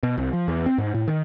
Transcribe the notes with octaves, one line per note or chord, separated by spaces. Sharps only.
B2
C2
F3
E2
C4
G#2
A2
D#3